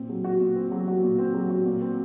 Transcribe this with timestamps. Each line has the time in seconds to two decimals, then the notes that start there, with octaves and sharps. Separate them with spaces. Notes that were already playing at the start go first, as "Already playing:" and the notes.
Already playing: A#2 C4
0.09 F#3
0.24 F#4
0.41 A#2
0.56 C4
0.72 F#3
0.88 F#4
1.03 A#2
1.18 C4
1.34 F#3
1.50 F#4
1.66 A#2
1.82 C4